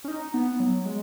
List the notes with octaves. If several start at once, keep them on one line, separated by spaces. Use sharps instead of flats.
C#4
D#4
B3
F#3
G#3